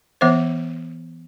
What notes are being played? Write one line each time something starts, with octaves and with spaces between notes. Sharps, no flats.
E3 B3 C5 E5